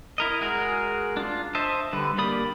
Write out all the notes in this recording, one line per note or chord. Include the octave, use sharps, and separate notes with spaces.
E4 A#4 D#5
G#3 F#4 G#4 A#4
D4 F4
C5 D#5 E5 A5
D3 G3 B4
A#3 G4 D5 B5 D#6